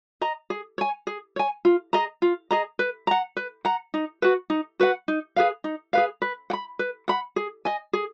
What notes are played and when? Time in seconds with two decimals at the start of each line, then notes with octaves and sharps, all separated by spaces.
0.21 D#5 A#5
0.50 G#4
0.78 C#5 G#5
1.07 G#4
1.36 C#5 G#5
1.65 F4
1.93 G#4 D#5 A#5
2.22 F4
2.51 G#4 D#5 A#5
2.79 B4
3.07 F#5 A#5
3.37 B4
3.65 F#5 A#5
3.94 D#4
4.22 F#4 B4 F#5
4.50 D#4
4.80 F#4 B4 F#5
5.08 D#4
5.36 G#4 B4 F5
5.64 D#4
5.93 G#4 B4 F5
6.22 B4
6.50 F#5
6.53 B5
6.79 B4
7.08 F#5 B5
7.36 G#4
7.65 D#5 G#5
7.93 G#4